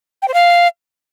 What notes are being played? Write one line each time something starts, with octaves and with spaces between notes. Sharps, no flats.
G5
C5
F5